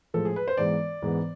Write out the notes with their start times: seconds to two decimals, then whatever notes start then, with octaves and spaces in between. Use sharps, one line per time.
0.14 A2 F3 G#3 A4
0.25 G#4
0.36 B4
0.48 C5
0.57 G#2 E3 G#3 B3 D5
1.02 G#2 E3 G#3 B3